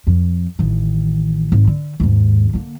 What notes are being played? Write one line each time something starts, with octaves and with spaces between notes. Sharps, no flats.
F2
A1 D#3
G#1
D3
D#2 G#2
D3 A#3